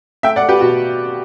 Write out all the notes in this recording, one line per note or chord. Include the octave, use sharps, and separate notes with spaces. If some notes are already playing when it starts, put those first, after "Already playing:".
A3 E5 G5
D5 F#5
A3
G4 B4
B2 F#4